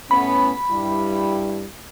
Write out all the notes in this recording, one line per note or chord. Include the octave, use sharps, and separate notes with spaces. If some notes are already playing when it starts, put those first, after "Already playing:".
A2 B3 C#4 B5
G2 G3 E4